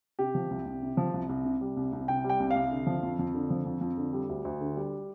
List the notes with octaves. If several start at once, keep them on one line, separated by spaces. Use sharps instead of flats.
C3 G4
F3
C2
C2
C3
F3
C2
C2
C3
G3
C2
C2
C3 G5
G3
G5
C2
C2 F5
D3
F3
F2
F2
D3
F3
F2
F2
D3
G3
D2
D2
D3
G3